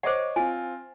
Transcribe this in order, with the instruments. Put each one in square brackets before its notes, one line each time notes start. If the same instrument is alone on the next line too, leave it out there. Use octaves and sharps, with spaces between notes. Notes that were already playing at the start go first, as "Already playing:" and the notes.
[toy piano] C5 F#5 [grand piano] C#5 D#5 D6
[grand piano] C4 F4 [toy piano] G#5